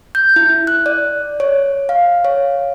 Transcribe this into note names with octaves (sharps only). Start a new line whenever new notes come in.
G6
E4
F#6
D5
C#5
F5
C#5